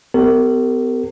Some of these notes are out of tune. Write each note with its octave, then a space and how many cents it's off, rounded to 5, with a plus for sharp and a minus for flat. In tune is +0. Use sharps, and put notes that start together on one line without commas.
B3 +35 G4 +0 A#4 -35